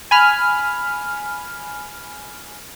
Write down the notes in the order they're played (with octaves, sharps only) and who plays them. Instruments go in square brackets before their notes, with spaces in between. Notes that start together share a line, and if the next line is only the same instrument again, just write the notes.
[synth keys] G#5 B5 F6